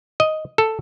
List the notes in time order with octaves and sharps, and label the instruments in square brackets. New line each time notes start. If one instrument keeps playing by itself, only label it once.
[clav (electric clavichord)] D#5
A4